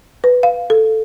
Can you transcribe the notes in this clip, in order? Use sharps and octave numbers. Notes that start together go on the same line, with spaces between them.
B4
F5
A4